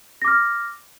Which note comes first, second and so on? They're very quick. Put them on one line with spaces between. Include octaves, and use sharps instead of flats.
A#6 D6 F6